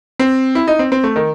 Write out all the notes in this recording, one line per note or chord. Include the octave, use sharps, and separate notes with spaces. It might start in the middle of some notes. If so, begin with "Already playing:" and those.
C4
E4
D#4
C4
C4
A3
D#3